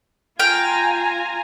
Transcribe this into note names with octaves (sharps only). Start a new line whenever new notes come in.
F4 F5 G5 G#5 A#5